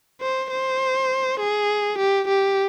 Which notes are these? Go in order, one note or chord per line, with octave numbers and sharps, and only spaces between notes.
C5
C5
G#4
G4
G4